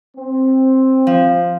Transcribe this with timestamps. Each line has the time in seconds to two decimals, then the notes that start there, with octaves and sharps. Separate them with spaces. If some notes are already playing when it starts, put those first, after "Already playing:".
0.17 C4
1.07 F3